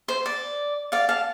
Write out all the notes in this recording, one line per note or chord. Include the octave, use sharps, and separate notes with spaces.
C5
D5
D5 F5
F5 A5